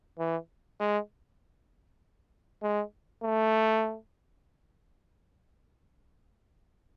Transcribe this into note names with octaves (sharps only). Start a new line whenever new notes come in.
E3
G#3
G#3
A3